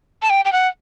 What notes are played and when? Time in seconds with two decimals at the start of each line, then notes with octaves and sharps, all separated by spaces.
0.22 A5
0.30 G5
0.45 G5
0.53 F#5